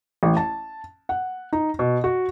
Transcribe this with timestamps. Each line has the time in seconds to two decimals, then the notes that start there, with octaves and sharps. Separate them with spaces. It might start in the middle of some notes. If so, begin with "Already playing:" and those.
0.23 A1
0.37 A5
1.09 F#5
1.53 D#4
1.79 B2
2.04 F#4